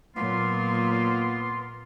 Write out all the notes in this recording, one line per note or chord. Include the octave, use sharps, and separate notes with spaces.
A#2 F#3 A#3 B3 F4 C6